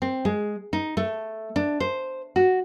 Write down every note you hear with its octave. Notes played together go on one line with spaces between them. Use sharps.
C4
G#3
D#4
A3
D4
C5
F#4